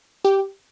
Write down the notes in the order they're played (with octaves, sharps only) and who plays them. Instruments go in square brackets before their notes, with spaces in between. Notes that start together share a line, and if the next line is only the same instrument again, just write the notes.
[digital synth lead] G4